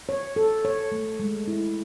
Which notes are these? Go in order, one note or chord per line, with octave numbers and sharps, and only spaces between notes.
C#5
A4
C#5
A3
G#3
E4